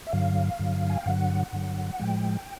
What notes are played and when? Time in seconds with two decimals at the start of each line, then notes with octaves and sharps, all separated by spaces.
0.07 E5
0.13 G2 D3 F#3 F5
0.59 G2 D3 F#3
0.90 G#5
0.99 G5
1.06 G2 D3 F#3 F#5
1.53 G2 D3 F#3
2.00 A2 F3 G#3 G5